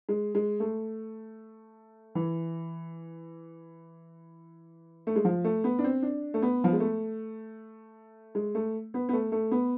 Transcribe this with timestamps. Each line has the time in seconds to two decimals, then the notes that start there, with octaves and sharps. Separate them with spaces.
0.09 G#3
0.35 G#3
0.60 A3
2.15 E3
5.07 A3
5.16 G#3
5.25 F3
5.44 A3
5.64 B3
5.79 D4
5.84 C4
6.02 D4
6.34 A3
6.42 B3
6.64 F3
6.73 G#3
6.80 A3
8.35 G#3
8.55 A3
8.94 B3
9.09 B3
9.13 A3
9.32 A3
9.51 B3